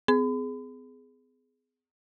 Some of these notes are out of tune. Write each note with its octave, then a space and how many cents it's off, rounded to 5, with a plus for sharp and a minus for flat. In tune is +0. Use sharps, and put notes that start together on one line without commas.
B3 +45 G#4 +10 B5 +40